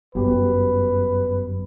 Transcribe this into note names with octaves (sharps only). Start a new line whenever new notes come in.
G1 F#2 F#3 B3 G4 B4